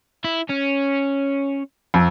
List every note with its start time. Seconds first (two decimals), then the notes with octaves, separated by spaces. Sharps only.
0.24 E4
0.50 C#4
1.94 F2